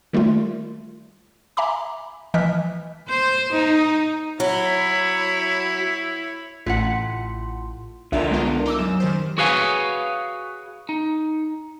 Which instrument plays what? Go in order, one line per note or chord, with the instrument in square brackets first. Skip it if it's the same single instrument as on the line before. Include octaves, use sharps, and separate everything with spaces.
[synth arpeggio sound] D#3 G3 A3 F4
E5 G#5 A#5 B5 D6
E3 F3 D#5 F6 F#6 B6
[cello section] C5
D#4
[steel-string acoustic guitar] F#3 [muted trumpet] E4 [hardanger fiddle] C#5 B5
[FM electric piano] A1 [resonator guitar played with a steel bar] A2 C3 F#5 [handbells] F4
[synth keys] C2 F4 E5 [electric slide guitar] D3 D4 A#4
[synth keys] G#3 B3 F4
D#4 D6 E6
[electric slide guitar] F#2 [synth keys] E7
[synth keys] D#3 G3 C5
[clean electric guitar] F#4 G#4 B4 C#5 F5 G#5
D#4